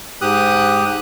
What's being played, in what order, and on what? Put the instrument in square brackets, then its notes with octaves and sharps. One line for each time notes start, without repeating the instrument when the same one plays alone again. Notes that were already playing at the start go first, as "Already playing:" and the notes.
[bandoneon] G#2 G4 D#6 F#6